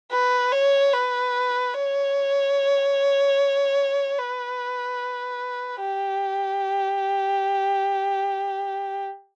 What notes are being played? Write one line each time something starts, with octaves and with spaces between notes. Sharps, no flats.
B4
C#5
B4
C#5
B4
G4